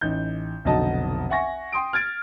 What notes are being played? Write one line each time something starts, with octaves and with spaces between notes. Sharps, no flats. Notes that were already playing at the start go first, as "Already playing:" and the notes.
A1 D#4 G6
F1 B1 D3 F#4 D#5 A5
E5 F#5 G#5 C#6 A#6
G5 C6 D#6 D7
F6 G#6 A6 D7